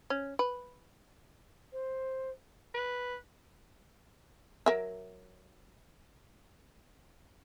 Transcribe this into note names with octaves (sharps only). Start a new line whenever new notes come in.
C#4
B4
C5
B4
F#3 A#4 E5